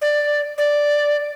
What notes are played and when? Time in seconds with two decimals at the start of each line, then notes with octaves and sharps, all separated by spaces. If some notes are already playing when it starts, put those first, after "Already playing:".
0.01 D5
0.58 D5